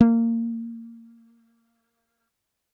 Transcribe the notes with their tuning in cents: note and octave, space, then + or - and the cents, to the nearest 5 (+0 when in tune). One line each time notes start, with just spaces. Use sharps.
A#3 -20